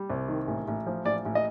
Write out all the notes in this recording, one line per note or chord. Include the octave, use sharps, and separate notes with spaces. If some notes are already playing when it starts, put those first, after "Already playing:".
Already playing: G3
C2
D#3
A1
A1
F3
A1 D5
A1
D#5